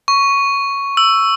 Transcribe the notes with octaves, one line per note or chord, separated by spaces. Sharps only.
C#6
E6